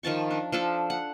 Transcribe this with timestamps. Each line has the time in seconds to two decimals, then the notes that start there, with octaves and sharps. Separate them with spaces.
0.03 D#3 F3 A5 C#6
0.31 D4
0.52 F3 D4 A4
0.90 F#5